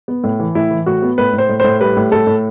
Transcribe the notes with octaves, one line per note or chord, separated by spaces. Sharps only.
B3
A2
E3
A2 E4
E3
A2 F#4
B3
A2 B4
A2
C5
A2
A2 C5
G3 B4
A2
A2 A4
A2